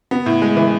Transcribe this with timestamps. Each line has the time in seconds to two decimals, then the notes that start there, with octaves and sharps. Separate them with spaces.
0.11 B3
0.26 A2
0.42 G#3
0.57 E3